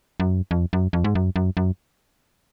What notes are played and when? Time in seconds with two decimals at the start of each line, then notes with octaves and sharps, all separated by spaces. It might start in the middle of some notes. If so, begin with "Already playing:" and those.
0.20 F#2
0.51 F2
0.73 F#2
0.93 F2
1.04 G#2
1.15 F#2
1.36 F#2
1.57 F#2